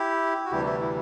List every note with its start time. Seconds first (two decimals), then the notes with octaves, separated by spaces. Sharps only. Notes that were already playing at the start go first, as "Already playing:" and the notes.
Already playing: E4 G4
0.46 F#4
0.51 D2 C3 E3 G3 E4 G4
0.66 E4 G4
0.81 E4